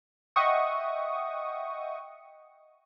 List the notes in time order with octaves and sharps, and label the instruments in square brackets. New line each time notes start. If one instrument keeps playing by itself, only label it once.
[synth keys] D#5 E5 F#5 G5 C#6 D#6